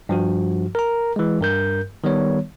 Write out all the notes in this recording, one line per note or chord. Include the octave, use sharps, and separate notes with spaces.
G2 F3 F#4
A#4 A#5
E3 G#3
G2 A#4 G6
D#3 G3 B3 C#5